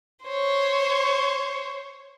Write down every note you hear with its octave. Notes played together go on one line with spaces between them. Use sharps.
C5 C#5